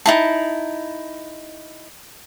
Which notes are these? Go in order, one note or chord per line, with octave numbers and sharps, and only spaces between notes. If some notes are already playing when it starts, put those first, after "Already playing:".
D#4 E4 A5